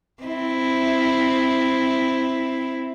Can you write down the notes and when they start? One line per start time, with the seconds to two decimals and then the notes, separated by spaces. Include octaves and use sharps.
0.23 C4 E4